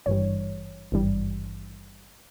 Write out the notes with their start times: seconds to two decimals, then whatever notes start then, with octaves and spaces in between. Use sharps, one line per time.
0.06 G#1 G2 E3 G3 C#5
0.92 G#1 G2 E3 G3